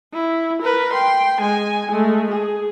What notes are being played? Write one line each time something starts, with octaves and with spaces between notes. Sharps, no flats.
E4
A#4 B4
G5 C6
G#3 G#5
G#3 A3
G#4